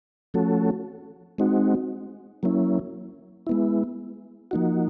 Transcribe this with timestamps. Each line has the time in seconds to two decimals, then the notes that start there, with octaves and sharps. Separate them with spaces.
0.34 F3 A3 C#4 F#4 A4
1.38 G#3 C4 D#4 F#4
2.43 F#3 A#3 C#4 E4
3.47 G#3 B3 E4
4.51 F3 A#3 D#4 F#4